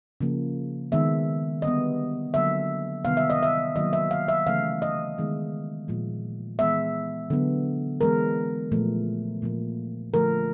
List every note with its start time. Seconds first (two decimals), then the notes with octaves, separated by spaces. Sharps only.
0.21 C#3 F3 A#3
0.92 D#3 G#3 B3 E5
1.62 D3 G3 B3 D#5
2.34 D3 F#3 A#3 E5
3.04 C3 D#3 G3 B3 F5
3.17 E5
3.30 D#5
3.43 E5
3.76 D#3 F#3 A#3 D#5
3.93 E5
4.11 F5
4.28 E5
4.46 C#3 E3 A3 F5
4.82 D#5
5.18 D#3 G#3 B3
5.88 A#2 F3 G#3
6.59 E3 G#3 B3 E5
7.30 D3 F#3 B3
8.01 E3 G#3 B3 A#4
8.72 A#2 F3 A3
9.42 A#2 F3 A#3
10.13 D3 F3 A3 A#4